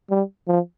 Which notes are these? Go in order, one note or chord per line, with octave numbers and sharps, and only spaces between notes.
G3
F3